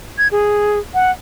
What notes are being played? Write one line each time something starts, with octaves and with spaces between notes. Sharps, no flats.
G#6
G#4
F#5